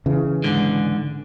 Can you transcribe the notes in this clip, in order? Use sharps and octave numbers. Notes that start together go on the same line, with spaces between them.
C#3 E3
G#2 D3